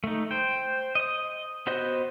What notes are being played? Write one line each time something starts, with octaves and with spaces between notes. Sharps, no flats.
A3 D#4
C5 G5
D#5 D#6
B3 F#4 C5 D#5